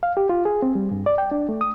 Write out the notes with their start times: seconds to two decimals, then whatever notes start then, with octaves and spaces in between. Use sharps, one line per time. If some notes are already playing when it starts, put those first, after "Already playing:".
0.03 F5
0.17 G4
0.29 F4
0.45 G#4
0.62 C4
0.75 G3
0.91 G2
1.06 D5
1.18 G5
1.31 D4
1.49 A3
1.61 D#6